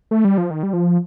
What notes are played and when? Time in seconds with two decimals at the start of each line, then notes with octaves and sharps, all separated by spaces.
0.11 A3
0.25 G3
0.38 F3
0.51 D#3
0.63 G3
0.73 F3